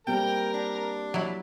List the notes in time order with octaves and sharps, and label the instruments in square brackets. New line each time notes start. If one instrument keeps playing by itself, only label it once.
[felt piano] G3 A#3 C4 [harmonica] A#4 A#5 [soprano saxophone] G5
[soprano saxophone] D4
[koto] F#3 E4